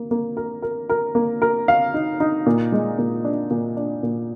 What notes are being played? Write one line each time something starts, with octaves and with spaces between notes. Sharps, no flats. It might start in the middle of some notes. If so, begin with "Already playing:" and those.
Already playing: A#3
A#3
A#4
A#4
A#4
A#3
A#4
F5
D#4
D#4
A#2
G#3
A#2
D4
A#2
D4
A#2